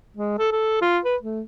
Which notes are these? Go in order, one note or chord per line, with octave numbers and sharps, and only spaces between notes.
G#3
A4
A4
F4
B4
A3